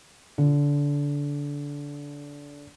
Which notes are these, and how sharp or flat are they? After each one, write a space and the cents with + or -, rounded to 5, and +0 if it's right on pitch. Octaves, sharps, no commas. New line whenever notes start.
D3 -25